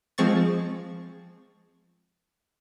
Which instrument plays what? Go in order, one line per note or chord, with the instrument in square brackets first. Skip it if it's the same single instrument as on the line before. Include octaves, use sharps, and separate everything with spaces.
[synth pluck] F3 G#3 C4 C#6 A6